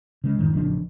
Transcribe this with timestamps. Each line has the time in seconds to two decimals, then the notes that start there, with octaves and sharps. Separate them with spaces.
0.24 C#3 G#3
0.39 F#2 A2 D#3
0.53 A1 C#3 F3 D4